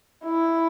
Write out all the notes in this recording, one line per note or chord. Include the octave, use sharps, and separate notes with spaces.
E4